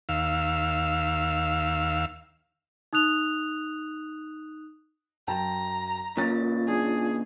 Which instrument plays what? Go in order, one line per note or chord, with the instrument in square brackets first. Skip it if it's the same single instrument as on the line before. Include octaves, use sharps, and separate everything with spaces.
[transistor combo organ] D#2 F5 E6
[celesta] D#4 D#6 F#6 F7
[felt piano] F#2 G5 A5 [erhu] A#5
[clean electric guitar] A#2 C#3 [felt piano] A#3 A6 [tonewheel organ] F4
[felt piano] D4 [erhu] G#4